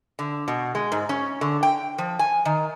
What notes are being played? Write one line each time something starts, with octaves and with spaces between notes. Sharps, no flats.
D3
B2
G#3
G#2
C#4
D3
G5
F3
G#5
D#3